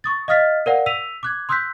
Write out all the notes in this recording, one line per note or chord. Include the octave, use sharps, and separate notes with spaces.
C#6 D#6 A6
D#5 F5 D#6 F6 A6 B6
A#4 C5 D5 F5 F#5
E6 B6 D#7 F7
D6 F#6 G#6
C6 D#6 E6 F#6 G6 B6